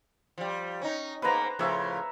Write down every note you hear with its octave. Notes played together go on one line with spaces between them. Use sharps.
F3 G3
C#4 D#4
G#2 A#3 B3 B4 C5 A#5
A2 C#3 F3 C#5 E5